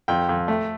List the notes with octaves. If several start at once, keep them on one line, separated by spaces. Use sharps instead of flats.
F2 G5
F2
A3